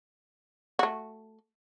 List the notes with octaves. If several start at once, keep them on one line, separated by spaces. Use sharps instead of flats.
A3 F#4